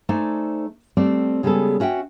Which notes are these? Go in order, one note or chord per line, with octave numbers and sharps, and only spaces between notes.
A3 D#4 A4 C5 D5 G#5
G3 A3 C4 D5
C#3 G3 G#3 B3 G#4 A4
C#4 F#4 E5 F#5 G5